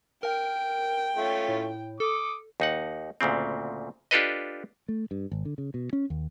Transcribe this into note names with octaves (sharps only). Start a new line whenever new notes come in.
A#4 G5
A3 C#4 F4
A2
A4 D6 D#6
D#2 D#4 F#5
D2 A#2 C#3 C4
D4 F4 G4 A4 B4 D#5
A3
G2
G#1
D3
C#3
B2
C#4
D#2